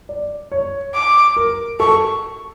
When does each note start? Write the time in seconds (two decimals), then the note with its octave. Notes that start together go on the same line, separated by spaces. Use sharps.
0.09 D5
0.52 C#5
0.95 D6
1.36 A#4
1.80 A4 C#6